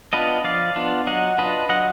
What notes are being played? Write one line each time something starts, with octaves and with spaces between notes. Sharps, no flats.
B3 D4 F4 B4 D#5
F3 D5 F5
B3 D4 F4
F#3 D#5 F#5
D4 F4 B4 D#5
F#3 D#5 F#5